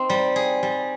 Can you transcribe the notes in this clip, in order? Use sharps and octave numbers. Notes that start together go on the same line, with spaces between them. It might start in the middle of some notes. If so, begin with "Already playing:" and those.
Already playing: C4 D#4
G3
G#4
G3